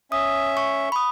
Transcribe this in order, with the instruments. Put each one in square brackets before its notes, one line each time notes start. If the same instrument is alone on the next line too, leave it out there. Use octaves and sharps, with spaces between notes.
[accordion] C#4 E5 [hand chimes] D#6
[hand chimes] C#6
B5 D#6